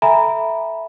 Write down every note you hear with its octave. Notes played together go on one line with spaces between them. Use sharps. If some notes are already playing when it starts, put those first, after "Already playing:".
A4 E5 G#5 A#5 B5